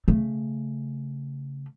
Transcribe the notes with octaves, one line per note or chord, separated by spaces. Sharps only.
C#3 A3